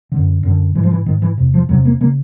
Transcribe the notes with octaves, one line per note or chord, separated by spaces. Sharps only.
F#2 D3
F#2 D3
G#2 E3
F3
E3
G#2 D#3
E3
E2 C3
F3
E2 C3 F#3
A#3
C#3 A#3